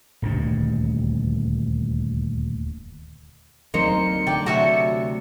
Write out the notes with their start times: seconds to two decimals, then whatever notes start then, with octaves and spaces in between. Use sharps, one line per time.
0.22 D#1 D2 G2 B2
3.74 D2 F#3 A#3 C4 D#4 C5 C#7
4.26 D3 F#3 A3 D5 G5 A5
4.46 D2 C3 F#4 C#5 E5 A5